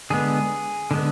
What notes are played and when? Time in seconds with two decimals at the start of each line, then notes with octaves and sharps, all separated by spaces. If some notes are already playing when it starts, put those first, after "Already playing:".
0.10 D3 G#3 B3 G#4
0.91 D3 G#3 B3